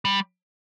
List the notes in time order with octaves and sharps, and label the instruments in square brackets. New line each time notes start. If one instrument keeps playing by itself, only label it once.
[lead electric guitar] G3